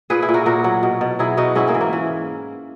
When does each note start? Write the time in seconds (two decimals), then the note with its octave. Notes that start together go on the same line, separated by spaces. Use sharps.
0.10 A#2 G#4 B4
0.22 E4 G#4
0.29 A#2
0.34 F#4 A#4
0.46 A#2 F#4 A#4
0.64 F#3
0.83 B2
1.01 B2
1.19 F#3 E4 G#4
1.37 B2 D#4 F#4
1.55 G#2 C#4 E4
1.67 A#3 C#4
1.74 E3
1.81 A#3
1.93 E3